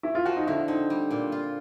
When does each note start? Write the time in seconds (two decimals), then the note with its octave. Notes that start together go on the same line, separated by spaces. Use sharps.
0.03 E4
0.15 F4
0.25 F3 F#4
0.37 D#4
0.47 D3 E4
0.68 C4 D#4
0.90 G3
1.11 A#2
1.32 F4